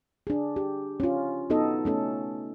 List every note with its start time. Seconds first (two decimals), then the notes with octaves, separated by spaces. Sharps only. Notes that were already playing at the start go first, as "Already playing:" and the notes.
0.27 D4 G#4
0.56 G4
1.00 C#4 F4
1.50 B3 D#4 F#4 A4 D#5
1.85 A3 C#4 A4